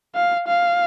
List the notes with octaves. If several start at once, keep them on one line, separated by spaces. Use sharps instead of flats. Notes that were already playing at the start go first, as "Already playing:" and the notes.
F5
F5